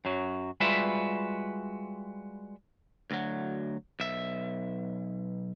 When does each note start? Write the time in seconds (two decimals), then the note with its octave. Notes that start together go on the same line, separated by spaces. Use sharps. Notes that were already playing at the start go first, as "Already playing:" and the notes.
0.05 F#2 F#3
0.60 G3 G#3 F4 F#4 B4 E5
3.11 D2 F#3
4.00 B1 E5